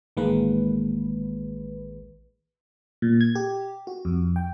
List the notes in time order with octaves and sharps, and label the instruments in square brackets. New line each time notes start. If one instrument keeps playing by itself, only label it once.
[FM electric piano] A1 D#3 G#3 A#3 B4
A#2
G#6
G4
F#4
F2
G5